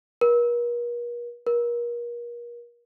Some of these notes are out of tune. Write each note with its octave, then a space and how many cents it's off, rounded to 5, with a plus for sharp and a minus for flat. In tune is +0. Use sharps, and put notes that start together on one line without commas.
A#4 +45
A#4 +35